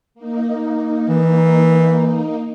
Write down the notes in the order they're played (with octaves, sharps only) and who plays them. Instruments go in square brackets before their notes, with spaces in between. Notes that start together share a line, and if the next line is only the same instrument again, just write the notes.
[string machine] A#3 D#4
[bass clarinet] E3